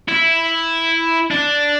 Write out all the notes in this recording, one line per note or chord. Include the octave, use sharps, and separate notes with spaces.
E4
D4